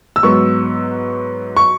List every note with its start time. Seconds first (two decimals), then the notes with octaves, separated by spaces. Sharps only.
0.16 E6
0.23 G#2 F#3 B3 C#6
1.57 C#6